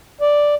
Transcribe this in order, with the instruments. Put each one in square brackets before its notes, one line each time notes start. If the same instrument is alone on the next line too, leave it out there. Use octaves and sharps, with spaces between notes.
[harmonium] D5